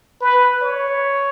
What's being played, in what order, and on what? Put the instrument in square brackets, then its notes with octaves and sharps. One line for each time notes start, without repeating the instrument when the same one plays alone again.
[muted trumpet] B4
C#5